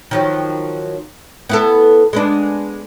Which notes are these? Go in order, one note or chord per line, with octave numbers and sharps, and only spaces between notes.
D#3 F3 F#3
B3 E4 A4
G#3 B3 D4